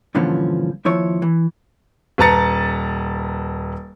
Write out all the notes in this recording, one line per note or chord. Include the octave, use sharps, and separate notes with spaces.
G2 A#2 D3 E3 F3 C#4
D#2 F3 E4 C#5
E3
D#1 B4 A5 A#5 A6 C#7